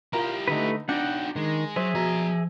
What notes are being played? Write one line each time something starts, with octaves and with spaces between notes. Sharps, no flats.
E4 F4 G4 A#4
D3 A3 D#4 B4
D4 D#4 F#4 F#5 G5
D#3 G#3
F#3 G#4 C5 E5
B2 F3 A#5